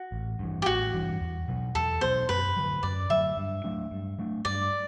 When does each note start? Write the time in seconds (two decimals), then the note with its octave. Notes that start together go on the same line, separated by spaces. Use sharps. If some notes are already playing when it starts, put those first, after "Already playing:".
Already playing: F#4
0.12 A1
0.39 G2 E3
0.62 G4
0.66 A1 F#4
0.94 G2 E3
1.21 E2
1.48 B2 F#3 B3
1.75 E2 A4
2.01 B2 F#3 B3 C5
2.29 F#2 B4
2.57 D3 F#3
2.83 F#2 D5
3.10 D3 F#3 E5
3.37 G2
3.64 F#3 A3 D4
3.91 G2
4.19 F#3 A3 D4
4.45 G2 D5